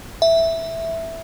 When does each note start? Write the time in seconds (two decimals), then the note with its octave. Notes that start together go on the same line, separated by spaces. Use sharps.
0.22 E5